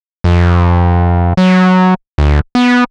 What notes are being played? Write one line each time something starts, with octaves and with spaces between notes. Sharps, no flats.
F2
F#3
D2
B3